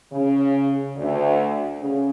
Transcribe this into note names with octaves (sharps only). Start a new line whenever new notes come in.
C#3
D2 D3
C#3